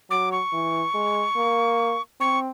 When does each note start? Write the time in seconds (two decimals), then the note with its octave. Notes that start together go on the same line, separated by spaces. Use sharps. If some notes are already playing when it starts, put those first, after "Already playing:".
0.10 F#3 D6
0.32 C#6
0.53 E3
0.94 G#3
1.36 A#3
2.20 C4 C#6